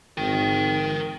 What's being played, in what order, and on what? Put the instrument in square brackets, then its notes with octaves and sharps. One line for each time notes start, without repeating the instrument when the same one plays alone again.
[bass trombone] G#1 [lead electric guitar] A#4 G5